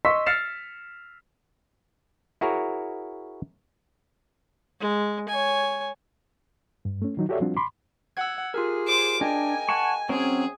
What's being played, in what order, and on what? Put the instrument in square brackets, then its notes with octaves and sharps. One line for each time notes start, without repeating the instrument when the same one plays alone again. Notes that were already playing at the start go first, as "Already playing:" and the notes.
[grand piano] D#5 C6 C#6 E6 B6
F6 A6 C7 C#7 E7
[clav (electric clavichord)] E4 F#4 G#4 A#4 C#5
[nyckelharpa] G#3
C#5 G#5
[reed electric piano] G2
A3 C#4
D#3 F#3 D#4
F#4 G4 A4 C#5 D5 E5
F3 G3 C4 D4 F4 F#4
B5 C6 D6
[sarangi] F#5 [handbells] E6 G#6
[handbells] F4 G4 A#4 [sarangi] G#4
[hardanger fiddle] C5 D6
[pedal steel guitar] D4 [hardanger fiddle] A#4 [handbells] D#5 G5 [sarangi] G#5
[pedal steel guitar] F#5 A5 C#6
[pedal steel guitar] F#3 C4 C#4 [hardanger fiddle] G#4